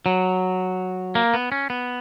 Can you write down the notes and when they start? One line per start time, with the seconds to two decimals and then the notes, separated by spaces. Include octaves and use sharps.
0.06 F#3
1.15 A#3
1.34 B3
1.52 C#4
1.70 B3